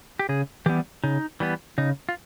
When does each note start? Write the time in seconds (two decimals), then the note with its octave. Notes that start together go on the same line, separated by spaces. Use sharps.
0.19 G4
0.29 C#3 G#4
0.66 E3 G3 B3 G4
1.03 C#3 D#4
1.40 E3 G3 B3
1.78 C#3 D#4
2.09 F4